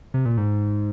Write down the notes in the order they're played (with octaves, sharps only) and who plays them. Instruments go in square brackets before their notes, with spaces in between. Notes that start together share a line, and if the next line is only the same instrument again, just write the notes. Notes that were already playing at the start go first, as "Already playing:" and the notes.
[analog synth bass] C3
A#2
G#2